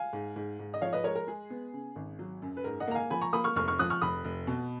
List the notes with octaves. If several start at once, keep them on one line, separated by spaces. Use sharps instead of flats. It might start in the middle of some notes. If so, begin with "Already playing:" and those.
Already playing: F5 G#5
G#2
G#2
G#2
D#5
F3 C#5 F5
B4 D#5
G#3 A#4 C#5
A#4
G#3 G#4
B3
C#3
G#1
F#3
F#2
B4
G#2 A#4
D#5 F#5
A#3 A#5
F5 G#5
F3 G#5 B5
A#5 C#6
A#3 B5 D#6
C#6 F6
F1 C#6 F6
C#6 F6
F3 D#6 F#6
C#6 F6
F1 B5 D#6
F1
B2